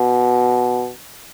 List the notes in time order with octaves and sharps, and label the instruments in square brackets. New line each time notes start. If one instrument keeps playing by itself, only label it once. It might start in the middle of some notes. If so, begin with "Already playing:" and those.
Already playing: [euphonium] B2